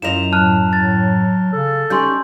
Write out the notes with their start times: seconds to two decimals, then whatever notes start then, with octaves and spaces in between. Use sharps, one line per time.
0.02 F#2 F#3 E4 F4 D#5 E7 F7
0.32 A2 F#3 A5 F6 F#6
0.73 A2 A6
1.53 C#3 A4
1.90 G3 C#4 D#4 C6 G6